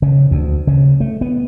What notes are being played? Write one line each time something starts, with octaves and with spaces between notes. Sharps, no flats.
C#3
D2
C#3
A3
B3